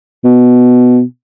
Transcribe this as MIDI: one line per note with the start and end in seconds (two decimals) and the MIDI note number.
0.24 1.01 47